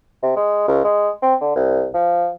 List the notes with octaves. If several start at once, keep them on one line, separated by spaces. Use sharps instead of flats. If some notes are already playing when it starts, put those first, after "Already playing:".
C3
G#3
C#2
G#3
C4
D3
C2
F3